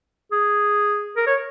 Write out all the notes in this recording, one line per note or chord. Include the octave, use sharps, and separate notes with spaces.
G#4
A#4
C#5